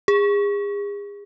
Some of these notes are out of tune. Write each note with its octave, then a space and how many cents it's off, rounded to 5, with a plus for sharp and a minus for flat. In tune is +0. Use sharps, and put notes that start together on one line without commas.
G#4 -35